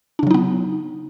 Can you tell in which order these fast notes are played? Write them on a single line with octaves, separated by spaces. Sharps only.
D4 C#3 F#3 D#4 B3